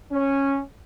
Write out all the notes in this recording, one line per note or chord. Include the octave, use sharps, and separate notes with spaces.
C#4